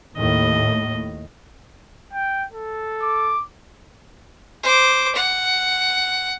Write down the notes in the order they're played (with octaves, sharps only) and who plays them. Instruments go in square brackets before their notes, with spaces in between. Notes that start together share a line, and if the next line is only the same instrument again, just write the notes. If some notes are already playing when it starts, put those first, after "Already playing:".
[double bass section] D#2 A2 [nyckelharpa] D#5
[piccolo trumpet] G5
A4
[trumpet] D6
[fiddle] C5 D6
F#5